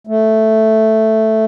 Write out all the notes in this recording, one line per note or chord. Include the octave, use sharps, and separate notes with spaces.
A3